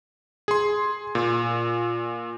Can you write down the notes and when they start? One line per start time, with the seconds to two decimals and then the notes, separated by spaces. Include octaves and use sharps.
0.48 G#4 C6
1.15 A#2